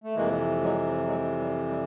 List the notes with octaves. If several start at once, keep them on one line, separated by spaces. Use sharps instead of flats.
A3
F2 C3 E3 G#3 A#3
F#3 G#3
F#3 G#3
G3
G3